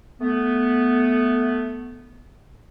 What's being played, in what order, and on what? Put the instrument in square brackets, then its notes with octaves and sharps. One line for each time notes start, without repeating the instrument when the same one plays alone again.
[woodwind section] A3 B3